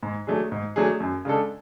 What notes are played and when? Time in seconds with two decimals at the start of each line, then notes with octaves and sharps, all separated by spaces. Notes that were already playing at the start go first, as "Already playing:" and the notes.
0.03 G#2
0.27 F#3 A3 D4 G#4
0.52 G#2
0.76 F#3 A3 D4 G#4
1.00 F#2
1.25 C#3 G#3 D4 A4